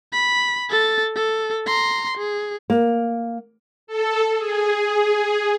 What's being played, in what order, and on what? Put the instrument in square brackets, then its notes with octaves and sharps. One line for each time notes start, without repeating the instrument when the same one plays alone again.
[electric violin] B5
A4 A6
A4
A#5 C6
G#4
[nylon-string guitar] A#3
[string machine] A4
G#4